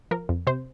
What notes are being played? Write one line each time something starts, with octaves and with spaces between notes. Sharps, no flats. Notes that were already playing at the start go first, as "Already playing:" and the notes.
F3 A#4
F2
C3 C5